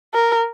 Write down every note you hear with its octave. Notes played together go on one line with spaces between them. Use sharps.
A#4